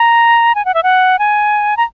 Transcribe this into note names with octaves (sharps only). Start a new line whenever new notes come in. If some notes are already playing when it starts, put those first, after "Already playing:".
Already playing: A#5
G#5
F#5
E5
F#5
G#5
A#5